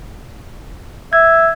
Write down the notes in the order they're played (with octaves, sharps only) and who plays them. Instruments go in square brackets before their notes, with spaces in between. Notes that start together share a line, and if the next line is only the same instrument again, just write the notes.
[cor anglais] E5 [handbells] G#6